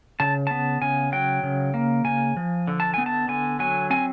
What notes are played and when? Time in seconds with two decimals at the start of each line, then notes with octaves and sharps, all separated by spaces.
0.20 C#3 A5
0.47 B3 A5
0.82 C#3 G#5
1.12 F#3 G5
1.43 C#3
1.74 A#3
2.05 C#3 G#5
2.37 F3
2.68 D3
2.80 A5
2.94 B3 G#5
3.06 A5
3.28 D3 G#5
3.59 F#3 G#5
3.90 C4 G#5